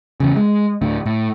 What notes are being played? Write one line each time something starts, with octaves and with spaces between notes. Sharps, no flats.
E2 C#3
G#3
D2 A2 D3
A2